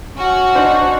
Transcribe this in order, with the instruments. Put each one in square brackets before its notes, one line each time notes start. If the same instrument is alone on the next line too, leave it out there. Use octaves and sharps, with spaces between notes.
[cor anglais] C#4 [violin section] F#4
[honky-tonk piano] D4 D#4 C5